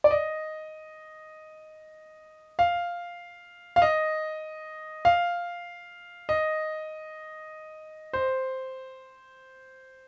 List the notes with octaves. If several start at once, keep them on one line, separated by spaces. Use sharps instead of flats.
D5
D#5
F5
F5
D#5
F5
D#5
C5